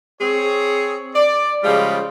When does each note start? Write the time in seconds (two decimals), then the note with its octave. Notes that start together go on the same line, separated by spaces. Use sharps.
0.21 C4 G#4 C#5
1.15 D5
1.64 C#3 F3 G3 G#3 F4